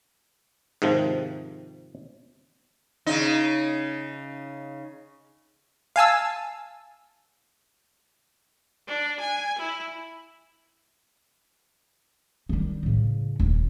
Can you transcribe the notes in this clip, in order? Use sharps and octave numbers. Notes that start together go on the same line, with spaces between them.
G#2 C3 D#3 F3
C#3 D#4
F5 G#5 A5 E6
D4
G#5
E4
D#3 G3
A2 C#3
D#1